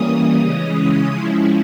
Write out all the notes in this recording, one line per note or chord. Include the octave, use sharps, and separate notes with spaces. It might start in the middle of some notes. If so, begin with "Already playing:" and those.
Already playing: E3 G3 A#3 C#4 D#6
C#3 E3 G#3 C#4
F3 G#3 C#4 E4